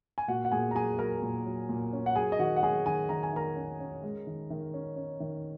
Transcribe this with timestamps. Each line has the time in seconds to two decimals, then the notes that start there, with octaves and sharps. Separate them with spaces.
0.18 G#5
0.28 A#2 F#4 F#5
0.45 F#5
0.52 A#2 G#4 G#5
0.71 A#5
0.75 F#3 G#4 G#5
0.98 F#3 A#4 A#5
1.22 A#2
1.46 F#3
1.69 A#2
1.93 C#4
2.06 F#5
2.16 F#3 G#4 G#5
2.32 D#5
2.39 D#3 F#4 F#5
2.56 F#5
2.63 F#3 G#4 G#5
2.86 D#3 G#4 G#5
3.09 D#3 A#5
3.23 G#5
3.33 D#3 A#4 A#5
3.56 C#4
3.80 C#4
4.03 G#3
4.27 D#3
4.50 D#3
4.74 C#4
4.96 C#4
5.20 D#3